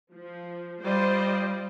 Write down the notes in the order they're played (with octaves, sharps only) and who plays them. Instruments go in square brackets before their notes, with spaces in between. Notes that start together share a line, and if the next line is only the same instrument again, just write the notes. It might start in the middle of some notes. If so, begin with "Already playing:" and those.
[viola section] F3
[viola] G3 F4 [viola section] C5 D5 D#5